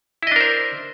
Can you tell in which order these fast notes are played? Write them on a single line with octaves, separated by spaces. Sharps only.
E4 D#5 D4 A#4 C5